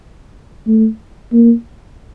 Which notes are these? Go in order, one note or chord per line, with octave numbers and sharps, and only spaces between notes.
A3
A#3